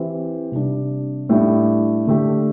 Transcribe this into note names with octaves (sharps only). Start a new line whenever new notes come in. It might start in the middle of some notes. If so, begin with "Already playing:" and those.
Already playing: E3 C4 G4
C3 G3 D4
A2 G3 D4
D3 A3 D4 G4